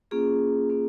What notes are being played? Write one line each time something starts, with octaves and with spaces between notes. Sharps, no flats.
A#3 C#4 F4 G#4
A#3 C#4 F4